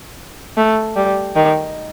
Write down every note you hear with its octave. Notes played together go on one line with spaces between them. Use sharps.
A3
G3
D#3